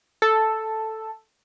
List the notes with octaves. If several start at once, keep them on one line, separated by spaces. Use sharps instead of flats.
A4